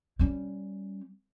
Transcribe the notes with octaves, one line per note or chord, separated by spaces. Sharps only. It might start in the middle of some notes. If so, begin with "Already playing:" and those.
G3 C#4